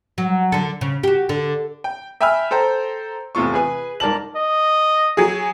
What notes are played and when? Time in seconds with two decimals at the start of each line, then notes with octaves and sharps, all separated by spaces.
0.18 F#3
0.52 D3 A4
0.81 C#3
1.03 F#4 G4
1.29 D3
1.84 G5
2.21 E5 G5 G#5 B5 E6 F6
2.51 A4 C5 G5 A#5
3.35 E2 A2 C3 F4 C#6
3.54 G#4 B4 G#5
4.00 G#2 A#4 D5 A5 F#7
4.36 D#5
5.17 F#3 G#4